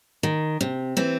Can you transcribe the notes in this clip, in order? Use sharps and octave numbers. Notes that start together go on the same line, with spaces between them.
D#3
C3
E3 C4